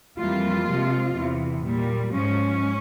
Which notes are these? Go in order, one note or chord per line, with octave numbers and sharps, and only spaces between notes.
F2 E3 G3 A#3 F4
C3 F3 G#3
E2 C3 E3
A#2 G3 A#3
G#2 F3 G#3 C#4